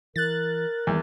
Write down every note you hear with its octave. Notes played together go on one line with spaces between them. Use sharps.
E3 A#4 F#6 A6
E2 D#3 G3